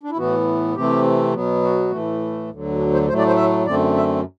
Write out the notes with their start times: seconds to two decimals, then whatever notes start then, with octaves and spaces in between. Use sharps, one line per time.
0.03 D4
0.11 E4
0.17 A2 E3 B3 F#4
0.75 C3 E3 A3 C4 G4
1.33 B2 F#3 B3
1.63 F#4
1.91 A2 E3 A3
2.51 D2 D3 F#3
2.78 D4
2.93 C5
3.08 A2 F#3 A3 C5
3.18 D5
3.27 C5
3.37 E5
3.66 F#2 D3 A3 C4 D5
3.96 E5